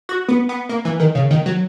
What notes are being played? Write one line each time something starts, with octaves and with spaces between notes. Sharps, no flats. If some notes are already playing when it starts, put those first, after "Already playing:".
F#4
B3
B3
A#3
E3
D#3
C#3
D#3
F#3